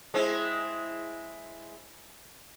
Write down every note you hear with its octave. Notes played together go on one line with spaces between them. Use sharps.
G#3 C4 E4